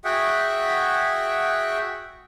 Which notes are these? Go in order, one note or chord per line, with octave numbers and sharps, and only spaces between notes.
F#4 G#4 E5 F#5 G5